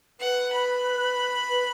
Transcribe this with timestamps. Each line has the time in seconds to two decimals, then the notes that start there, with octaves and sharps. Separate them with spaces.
0.20 B4 F#5
0.53 B5
1.50 B4